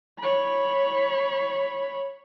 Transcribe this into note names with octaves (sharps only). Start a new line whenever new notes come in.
C#5 B5